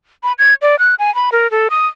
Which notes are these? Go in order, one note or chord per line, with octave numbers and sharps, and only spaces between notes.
B5
G#6
D5
F#6
G#5
B5
A#4
A4
D#6